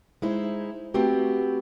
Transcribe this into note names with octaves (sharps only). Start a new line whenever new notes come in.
G#3 D#4 E4 C5
A3 B3 C4 F#4 G4